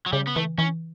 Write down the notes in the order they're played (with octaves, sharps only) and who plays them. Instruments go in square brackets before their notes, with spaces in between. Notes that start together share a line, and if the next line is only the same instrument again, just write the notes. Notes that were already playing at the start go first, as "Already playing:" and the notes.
[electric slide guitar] F#3
[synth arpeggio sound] C#3 [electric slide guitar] G3
[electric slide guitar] B3
[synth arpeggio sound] E3 [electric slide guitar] A3
[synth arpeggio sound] E3 [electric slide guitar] C#4